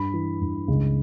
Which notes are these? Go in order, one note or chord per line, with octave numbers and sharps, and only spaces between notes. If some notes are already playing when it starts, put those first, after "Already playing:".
Already playing: G2 B5
E3
G2
C#2